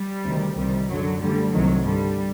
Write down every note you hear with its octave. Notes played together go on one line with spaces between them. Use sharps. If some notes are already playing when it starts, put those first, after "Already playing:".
Already playing: G3
D2 C3 D#3
C2 C3 D#3 G3
F#2 D3 F#3
D2 D3 G3
C2 C3 D#3 F#3
G2 D3 G3